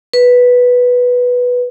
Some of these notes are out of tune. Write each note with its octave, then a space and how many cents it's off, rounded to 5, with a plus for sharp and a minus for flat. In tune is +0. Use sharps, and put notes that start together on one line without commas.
B4 -5